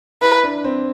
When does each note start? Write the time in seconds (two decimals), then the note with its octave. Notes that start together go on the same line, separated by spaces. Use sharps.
0.22 E4 B4
0.44 D4
0.64 C4